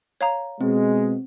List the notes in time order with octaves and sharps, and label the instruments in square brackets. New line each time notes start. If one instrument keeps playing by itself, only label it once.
[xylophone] C#5 F5 A#5
[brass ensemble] B2 G#3 [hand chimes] C4